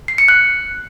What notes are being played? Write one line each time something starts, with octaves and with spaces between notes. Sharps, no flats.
C7
C#7
F#6